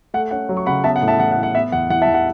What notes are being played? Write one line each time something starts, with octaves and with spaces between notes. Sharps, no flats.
A3 F#5
C#4 F#5
F#3
C#6
C#3 F#5 B5
B3 E5 A5
F#5
A2
E5 A5
E3 F#5
F#5
A2
F#5
B3 E5
E2 F#5
E3 F#5
E5 A5
E2
F#5